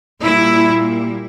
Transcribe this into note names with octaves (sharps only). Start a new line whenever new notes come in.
A#2 G3 A#3 E4